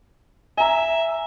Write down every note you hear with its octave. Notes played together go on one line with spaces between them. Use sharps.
E5 G#5 A#5